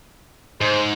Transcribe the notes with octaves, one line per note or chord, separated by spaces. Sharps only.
G#2 C5